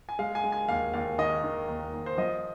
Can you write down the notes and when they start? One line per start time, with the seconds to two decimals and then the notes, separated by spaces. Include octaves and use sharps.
0.09 G#5
0.19 G#3 F5
0.35 G#5
0.44 G#3
0.52 G#5
0.69 D#2 F5
0.94 D#2 F5
1.18 D#3 D#5
1.44 D#3
1.68 D#2
1.94 D#2
2.06 C5
2.18 F3 D#5